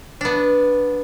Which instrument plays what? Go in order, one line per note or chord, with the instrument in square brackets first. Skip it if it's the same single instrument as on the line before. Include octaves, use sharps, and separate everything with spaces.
[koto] B3 D4